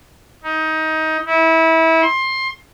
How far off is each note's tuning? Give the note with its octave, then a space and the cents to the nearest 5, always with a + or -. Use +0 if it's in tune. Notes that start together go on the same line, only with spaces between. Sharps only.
D#4 +20
E4 -25
C6 +20